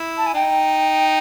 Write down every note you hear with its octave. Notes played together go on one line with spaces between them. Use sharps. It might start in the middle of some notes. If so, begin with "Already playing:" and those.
Already playing: E4
A5
G#5
D#4 G5